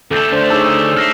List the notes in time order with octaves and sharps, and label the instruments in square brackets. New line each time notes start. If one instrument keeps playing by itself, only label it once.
[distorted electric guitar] D2 A3 [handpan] A4 [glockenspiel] D6 G6
[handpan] D4 C5
[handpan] D#4 G#4 C#5 [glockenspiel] A5 E6 E7
[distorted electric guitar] A4 E5 [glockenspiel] F6 A#6 C7